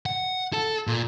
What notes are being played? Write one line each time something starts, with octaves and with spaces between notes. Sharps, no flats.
F#5
A4
A#2